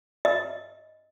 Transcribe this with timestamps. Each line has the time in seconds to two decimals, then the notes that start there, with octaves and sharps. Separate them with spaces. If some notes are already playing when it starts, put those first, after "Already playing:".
0.25 D#5